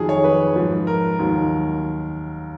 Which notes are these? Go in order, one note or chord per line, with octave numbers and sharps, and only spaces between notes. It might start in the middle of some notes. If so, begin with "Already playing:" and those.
Already playing: F2 D#3 F#3 G#4
C#5
B4
G#2 F3
A#4
D#2 D#3 F#3